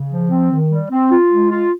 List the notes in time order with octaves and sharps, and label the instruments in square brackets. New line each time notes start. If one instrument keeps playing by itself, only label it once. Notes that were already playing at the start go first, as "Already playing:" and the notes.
Already playing: [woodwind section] C#3
F3
C4
D#3
G3
C4
F4
G#3
F4